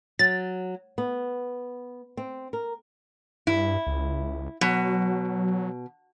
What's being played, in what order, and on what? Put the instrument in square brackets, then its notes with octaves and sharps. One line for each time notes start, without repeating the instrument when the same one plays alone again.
[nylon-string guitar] F#3 [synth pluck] A6
[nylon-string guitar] B3
C4
A#4
[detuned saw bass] G2 [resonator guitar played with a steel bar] E4
[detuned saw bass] C#2
[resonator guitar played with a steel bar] B2 [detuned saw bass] F#3